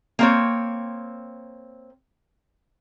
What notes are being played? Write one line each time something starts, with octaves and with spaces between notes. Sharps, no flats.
A#3 C4 C#5